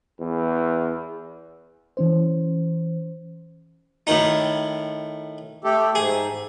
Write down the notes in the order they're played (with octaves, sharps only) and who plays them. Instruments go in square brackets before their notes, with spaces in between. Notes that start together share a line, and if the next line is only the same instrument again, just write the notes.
[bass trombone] E2
[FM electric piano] E3 C#4 C5
[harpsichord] A2 D#3 D#4
[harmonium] A3 G4 A4
[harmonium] G#2 [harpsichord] G#4